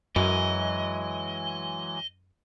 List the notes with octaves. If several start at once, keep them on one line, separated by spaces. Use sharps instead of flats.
F#2 E3 F#3 G#3 D#5